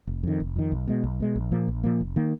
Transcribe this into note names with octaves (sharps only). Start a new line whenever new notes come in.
F1
F2 D#3
F1
F2 D#3
B1
B2 G#3
B1
B2 G#3
A#1
A#2 F3 A#3
A#1
A#2 F3 A#3
F1
D#3 A#3